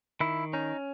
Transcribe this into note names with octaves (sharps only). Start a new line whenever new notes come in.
D#3 E4
C#4 D#4